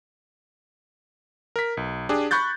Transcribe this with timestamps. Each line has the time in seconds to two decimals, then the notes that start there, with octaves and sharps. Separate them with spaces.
1.56 A#4 B6
1.77 B1
2.09 D4 G4 G#4
2.31 B5 C#6 F#6 G6 A6